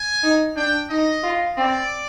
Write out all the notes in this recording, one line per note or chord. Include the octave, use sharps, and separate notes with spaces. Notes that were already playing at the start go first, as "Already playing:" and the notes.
Already playing: G#5
D#4
D4 G5
D#4 D#5
F4
C4 D5